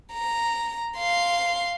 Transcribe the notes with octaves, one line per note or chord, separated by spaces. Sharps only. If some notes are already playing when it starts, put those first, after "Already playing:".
A#5
F5 C6